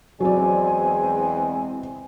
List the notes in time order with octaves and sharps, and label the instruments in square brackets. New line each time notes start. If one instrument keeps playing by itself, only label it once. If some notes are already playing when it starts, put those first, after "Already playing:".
[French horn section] E2 G#3 C4 [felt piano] F#3 D5 [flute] G#5